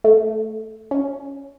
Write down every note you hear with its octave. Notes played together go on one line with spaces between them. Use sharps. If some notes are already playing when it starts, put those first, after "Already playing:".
A3
C#4